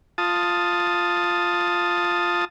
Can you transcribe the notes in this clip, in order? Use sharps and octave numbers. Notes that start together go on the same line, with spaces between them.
F4 A5 D#6